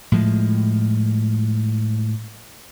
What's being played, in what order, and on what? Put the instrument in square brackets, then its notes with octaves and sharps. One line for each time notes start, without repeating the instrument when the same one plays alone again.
[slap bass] A2 F3 G#3